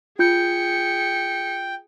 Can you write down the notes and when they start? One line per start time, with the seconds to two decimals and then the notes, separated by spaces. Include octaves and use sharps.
0.19 F4 G#4 G5 G6 C#7